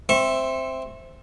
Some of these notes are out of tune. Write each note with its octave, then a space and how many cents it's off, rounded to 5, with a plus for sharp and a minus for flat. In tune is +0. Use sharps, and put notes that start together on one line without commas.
C4 +0 E5 +0 C#6 -30